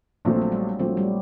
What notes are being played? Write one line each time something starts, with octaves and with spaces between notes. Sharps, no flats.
A#1 A#2 F3 F#3 A3 C4
F#3
G3
A#1 A#2 F3 F#3 A3 C4
G3